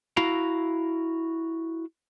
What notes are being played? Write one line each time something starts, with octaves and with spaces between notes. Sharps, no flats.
E4 F#4 F5 A#5